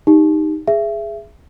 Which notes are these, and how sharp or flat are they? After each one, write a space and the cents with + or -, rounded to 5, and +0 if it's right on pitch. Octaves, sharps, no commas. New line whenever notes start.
D#4 +0 G4 +15
G#4 +0 E5 +25